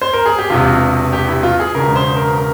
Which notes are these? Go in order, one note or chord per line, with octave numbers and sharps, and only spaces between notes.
C5
A#4
G#4
G4
E1 E2 C3 F4
G4
E4
F4
G#4
E1 E2 C#3 A#4
C5
A#4
A#4